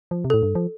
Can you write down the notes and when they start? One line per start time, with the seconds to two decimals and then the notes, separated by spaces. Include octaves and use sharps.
0.11 F3
0.25 C3
0.30 A2 A4
0.43 G2
0.55 F3